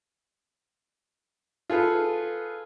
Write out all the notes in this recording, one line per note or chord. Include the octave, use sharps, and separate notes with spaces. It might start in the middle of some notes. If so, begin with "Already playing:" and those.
F4 G#4 A4 B4